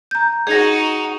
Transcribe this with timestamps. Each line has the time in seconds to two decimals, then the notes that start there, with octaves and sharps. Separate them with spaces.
0.11 A#5 G6
0.47 D#4 F#4 G#4 A#6